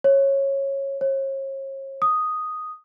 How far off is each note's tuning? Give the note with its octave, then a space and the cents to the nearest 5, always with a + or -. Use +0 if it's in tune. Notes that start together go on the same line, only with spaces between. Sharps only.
C#5 -15
C#5 -40
D#6 +0